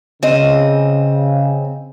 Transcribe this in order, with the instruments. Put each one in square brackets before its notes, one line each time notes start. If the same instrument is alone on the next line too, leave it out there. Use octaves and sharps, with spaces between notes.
[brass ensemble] C#3 [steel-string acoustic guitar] C4 D#5